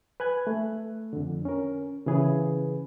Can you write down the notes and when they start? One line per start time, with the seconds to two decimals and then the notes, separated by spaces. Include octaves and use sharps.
0.20 B4 G#5 F#6 G#6
0.47 A3
1.13 F2 D3
1.45 C#4 A#4
2.06 C#3 E3 G#4 B4